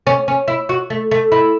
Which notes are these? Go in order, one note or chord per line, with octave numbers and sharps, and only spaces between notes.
C#4
C#4
E4
F#4
A3
A3
E4